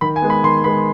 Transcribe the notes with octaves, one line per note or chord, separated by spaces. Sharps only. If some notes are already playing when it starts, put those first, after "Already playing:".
D#3 B5
G#5
G#3 B3
B5
D#3 C6
G#3 B3 B5